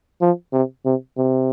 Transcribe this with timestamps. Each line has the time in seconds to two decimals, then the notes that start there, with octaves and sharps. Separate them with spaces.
0.21 F3
0.53 C3
0.85 C3
1.18 C3